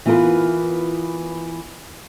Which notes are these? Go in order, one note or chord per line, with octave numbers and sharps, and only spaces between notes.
E3 B3 E4 F4 A#4